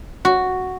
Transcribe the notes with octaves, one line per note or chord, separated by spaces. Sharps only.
F#4